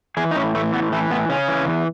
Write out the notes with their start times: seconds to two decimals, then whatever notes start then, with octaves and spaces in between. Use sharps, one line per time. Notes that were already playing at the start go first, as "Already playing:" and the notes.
0.17 E3 G#4
0.31 D#4
0.36 A2 C#4
0.55 E3 A3
0.73 A2 B3
0.92 E3 A3
1.11 A2 B3
1.29 C#3 C#4
1.48 E3
1.67 E2